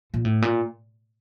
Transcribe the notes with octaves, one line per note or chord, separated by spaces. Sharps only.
A#2
A2
A#2